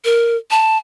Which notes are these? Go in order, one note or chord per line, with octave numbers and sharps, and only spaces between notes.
A#4
A5